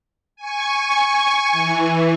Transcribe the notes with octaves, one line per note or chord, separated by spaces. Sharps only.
G#5 C#6
E3